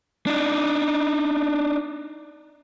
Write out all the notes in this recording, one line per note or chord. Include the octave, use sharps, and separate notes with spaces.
D4 D#4